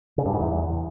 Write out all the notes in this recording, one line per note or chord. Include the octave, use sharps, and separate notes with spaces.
C#3
G2
G#2
E2